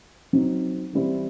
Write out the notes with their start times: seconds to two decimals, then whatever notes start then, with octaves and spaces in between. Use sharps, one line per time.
0.33 F#3 C4 D#4
0.93 E3 G3 C4 E4